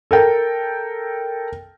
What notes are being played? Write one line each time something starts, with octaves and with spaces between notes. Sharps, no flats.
A4 A#4 G5